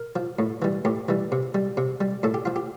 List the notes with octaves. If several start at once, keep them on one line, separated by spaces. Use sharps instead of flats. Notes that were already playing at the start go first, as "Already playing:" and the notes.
Already playing: A#4
F3
A2
E3 G3
A2 G4
E3 G3
C3
G3
C3
G3
A2 A4
G4
F3 F4
G4